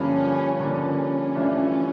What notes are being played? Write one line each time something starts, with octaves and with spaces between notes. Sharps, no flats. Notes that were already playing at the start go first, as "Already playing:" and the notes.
Already playing: G2 D3 F3 A#3 C#4
G2 D3 F3 A#3 C#4
G2 E3 A3 D4 F4